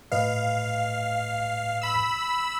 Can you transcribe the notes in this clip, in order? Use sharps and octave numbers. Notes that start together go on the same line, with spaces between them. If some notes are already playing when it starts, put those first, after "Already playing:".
A2 B4 D#5 F5
B5 E6